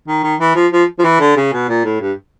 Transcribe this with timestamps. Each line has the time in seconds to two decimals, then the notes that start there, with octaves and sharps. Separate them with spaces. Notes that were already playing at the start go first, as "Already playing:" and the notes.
0.08 D#3
0.23 D#3
0.40 E3
0.55 F3
0.72 F3
0.99 F3
1.04 E3
1.20 D3
1.36 C#3
1.53 B2
1.69 A#2
1.85 A2
2.01 G2